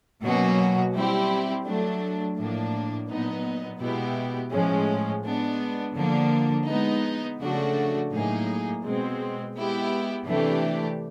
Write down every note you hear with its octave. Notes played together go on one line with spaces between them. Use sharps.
B2 F#3 A#3 C#4 F#4
G3 C4 E4 G4
F#3 A3 D4
A2 F3 A#3 D4
A#2 F#3 B3 D#4
B2 G#3 B3 E4 G4
A2 F3 G#3 C#4
G#3 B3 D4
D3 F3 A#3 D4
G#3 B3 D#4
C#3 F3 A3 D4 F#4
A2 F#3 A#3 D#4 G#4
B2 G#3 C4
G#3 B3 E4 G4
C3 E3 A3 D4 G4